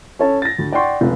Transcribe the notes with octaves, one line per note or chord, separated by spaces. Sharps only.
C#4 A4 C#5 A5
A6 A#6
D2
D5 F#5 G5 C6 C#6
F1 C#2